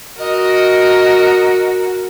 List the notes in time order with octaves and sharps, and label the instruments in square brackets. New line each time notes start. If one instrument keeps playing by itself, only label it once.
[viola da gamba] F#4 [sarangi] A#4 [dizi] D#5